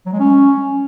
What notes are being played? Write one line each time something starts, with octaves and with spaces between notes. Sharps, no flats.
F#3
G#3
C#4